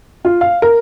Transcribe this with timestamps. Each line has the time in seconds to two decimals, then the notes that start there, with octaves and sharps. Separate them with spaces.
0.25 F4
0.41 F5
0.62 A#4